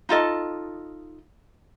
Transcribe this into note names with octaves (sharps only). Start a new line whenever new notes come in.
D#4 F4 A4 D#5